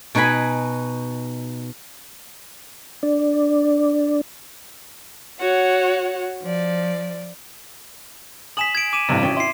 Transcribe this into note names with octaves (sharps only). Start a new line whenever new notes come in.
B2 D#4 B4 G#5 B5
D4 D5
F#4 C#5 F#5
F3 D5
G#5 D#6 B6 E7 F#7
G#6 D7
D6 D#7 E7
A1 G2 C3
G#1 C#4 G5
E4 C6 C7